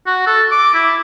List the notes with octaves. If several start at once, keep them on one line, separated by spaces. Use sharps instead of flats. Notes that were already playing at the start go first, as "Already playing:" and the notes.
F#4
A4
D6
E4